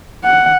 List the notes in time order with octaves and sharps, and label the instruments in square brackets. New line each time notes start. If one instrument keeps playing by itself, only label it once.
[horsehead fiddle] F#5